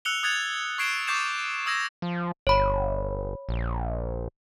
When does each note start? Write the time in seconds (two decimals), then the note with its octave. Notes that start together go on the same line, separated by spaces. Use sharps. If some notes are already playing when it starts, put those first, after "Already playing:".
0.05 E6 F#6 C#7 F7 G7
0.23 D#6 F#6 G#6 A6 C#7 F7
0.78 C#6 G#6 C7 D7 E7 G7
1.07 C#6 D6 G6 A6 C7 E7
1.66 D#6 E6 G#6 A#6 E7
2.02 F3
2.47 G1 C#5 B5
3.49 A#1